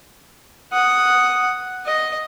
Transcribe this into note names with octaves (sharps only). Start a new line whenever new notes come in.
F#5 D#6
D#5